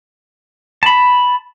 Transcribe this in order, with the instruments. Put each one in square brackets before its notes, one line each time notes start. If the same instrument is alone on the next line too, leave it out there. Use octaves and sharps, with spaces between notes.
[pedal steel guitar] A5 B5